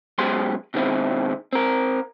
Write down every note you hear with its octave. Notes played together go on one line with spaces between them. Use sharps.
F#2 B2 G#3 G4 C5 C6
B2 D#3 G#3 C4 E4
C4 A#4